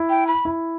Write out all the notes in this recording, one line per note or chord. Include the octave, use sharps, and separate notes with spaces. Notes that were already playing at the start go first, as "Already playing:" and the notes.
Already playing: E4
G5
B5
E4